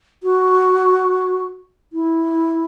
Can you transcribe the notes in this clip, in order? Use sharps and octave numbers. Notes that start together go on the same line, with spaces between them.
F#4
E4